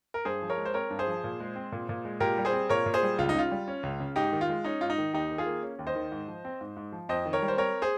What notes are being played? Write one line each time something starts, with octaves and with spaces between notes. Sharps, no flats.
A#4
G2 G#4 C5
F3
A#4 C#5
G#3
C5
C4 A#4 C#5
G2
G#4 C5
F3
A#2
G#3
C4
A#2
A#2
G#3
A#2 G4 A#4
G3
G#4 C5
C4
A#2 A#4 C#5
A#2
G#4 C5
G3
C#2 F4
D#4
C#3 F4
G3
C#4
C#2
C#3
G#2 D#4 G4
D#3
F4
G#3
C#4 D#4
G#2 F4
D#4
D#3
D#2 D#4 G4
D#3
F4 G#4
A#3
C#4
D#2
C5 D#5
D#3
G#2
F3
C4
G#2
G#2
F3
F2 C5 D#5
D#3
A#4 C#5
G3
C5
C4 A#4 C#5
G#4 C5